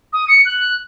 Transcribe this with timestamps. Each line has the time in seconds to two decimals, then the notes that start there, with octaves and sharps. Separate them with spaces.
0.13 D#6
0.28 C#7
0.45 F#6